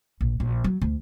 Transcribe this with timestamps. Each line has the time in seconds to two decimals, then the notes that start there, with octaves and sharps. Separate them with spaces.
0.21 A#1
0.40 A#1
0.64 F#3
0.81 D2